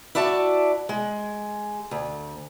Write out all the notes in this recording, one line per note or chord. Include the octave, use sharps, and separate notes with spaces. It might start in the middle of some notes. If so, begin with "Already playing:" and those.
E4 F#4 D5 A5
G#3
D2